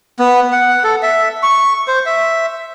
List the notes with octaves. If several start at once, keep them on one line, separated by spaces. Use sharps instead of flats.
B3
F#5
A4
E5
C#6
C5
E5